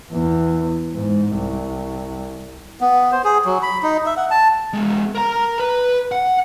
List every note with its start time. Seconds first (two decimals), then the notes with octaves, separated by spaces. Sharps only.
0.12 E2
0.93 G#2
1.35 C2
2.81 B3
3.12 C5
3.24 G#4
3.45 F#3
3.63 B5
3.83 D#4
4.06 E5
4.17 F#5
4.31 A5
4.73 G#3 B3
5.15 A#4 A#5
5.60 B4
6.12 F#5